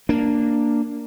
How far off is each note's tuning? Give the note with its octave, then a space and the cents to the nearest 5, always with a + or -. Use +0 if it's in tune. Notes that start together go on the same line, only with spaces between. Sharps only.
A#3 -5 D4 +0